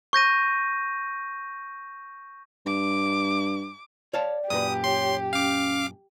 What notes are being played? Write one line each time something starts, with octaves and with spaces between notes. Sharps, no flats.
C#6 G6 A#6 D#7
G2 D6
C#5 D5 F5 A5
F#2 A#2 G4 B4 D#6
C#5 C6
C#4 F5 D6